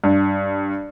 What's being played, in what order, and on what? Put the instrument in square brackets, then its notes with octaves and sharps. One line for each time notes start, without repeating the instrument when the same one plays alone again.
[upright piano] G2